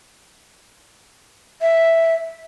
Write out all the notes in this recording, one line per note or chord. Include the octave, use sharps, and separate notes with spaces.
E5